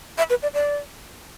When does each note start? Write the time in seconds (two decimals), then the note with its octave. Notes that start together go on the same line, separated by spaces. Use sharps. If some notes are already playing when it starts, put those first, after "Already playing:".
0.18 E5
0.30 B4
0.43 D5
0.54 D5